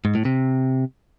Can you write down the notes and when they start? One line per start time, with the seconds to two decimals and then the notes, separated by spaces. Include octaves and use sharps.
0.05 G#2
0.15 A2
0.25 C3